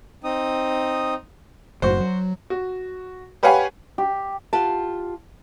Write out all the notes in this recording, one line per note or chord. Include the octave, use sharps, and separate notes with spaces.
C4 D#4 D#6
F#1 F#2 A2 F#4 C5
F#3
F#4
G4 B4 C#5 F5 F#5 G#5
G4
F4 G4 F#5 A5